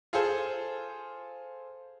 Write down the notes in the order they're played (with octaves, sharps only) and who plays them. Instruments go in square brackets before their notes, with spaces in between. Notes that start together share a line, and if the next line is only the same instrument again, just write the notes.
[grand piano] F4 G#4 A4 C5